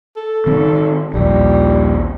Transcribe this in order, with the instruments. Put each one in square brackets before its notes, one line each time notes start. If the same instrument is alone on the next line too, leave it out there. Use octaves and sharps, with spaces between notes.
[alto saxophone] A4
[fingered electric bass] D#3 C4
[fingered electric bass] A#1 D#2 [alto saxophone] G3